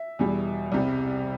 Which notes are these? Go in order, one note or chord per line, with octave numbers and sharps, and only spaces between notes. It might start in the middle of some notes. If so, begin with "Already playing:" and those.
Already playing: E5
E2 B2 G3
C2 C3 G3